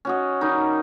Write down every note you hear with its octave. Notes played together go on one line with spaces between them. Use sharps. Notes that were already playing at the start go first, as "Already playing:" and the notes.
C#4 F#4 D#5
D#3 G3 D#4